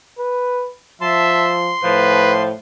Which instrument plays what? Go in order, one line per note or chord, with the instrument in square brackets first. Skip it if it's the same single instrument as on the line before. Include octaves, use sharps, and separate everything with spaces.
[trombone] B4
[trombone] F3 [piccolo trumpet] E5 [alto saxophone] A5 [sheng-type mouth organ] C6
[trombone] A2 [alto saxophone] F3 [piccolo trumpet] B4